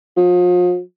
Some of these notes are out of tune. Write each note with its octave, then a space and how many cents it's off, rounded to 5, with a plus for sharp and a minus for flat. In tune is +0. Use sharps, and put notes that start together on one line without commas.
F3 +40